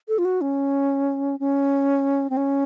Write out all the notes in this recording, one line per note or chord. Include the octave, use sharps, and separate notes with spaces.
A4
F4
F#4
C#4
C#4
C4
C#4